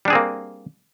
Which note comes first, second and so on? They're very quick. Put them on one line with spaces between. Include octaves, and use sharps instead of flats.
G3 D4 G#4 C4 A#3